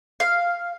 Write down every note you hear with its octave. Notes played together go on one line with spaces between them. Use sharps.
F5